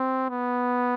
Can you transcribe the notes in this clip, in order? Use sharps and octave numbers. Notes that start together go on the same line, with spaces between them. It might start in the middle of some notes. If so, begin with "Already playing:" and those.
Already playing: C4
B3